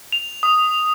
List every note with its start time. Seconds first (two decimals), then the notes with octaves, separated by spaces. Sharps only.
0.12 F7
0.43 D#6